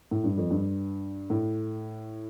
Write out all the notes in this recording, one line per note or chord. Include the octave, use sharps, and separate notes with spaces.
A2
G2
F2
G2
A2